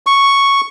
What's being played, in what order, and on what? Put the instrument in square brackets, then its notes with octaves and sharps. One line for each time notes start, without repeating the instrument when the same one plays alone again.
[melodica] C#6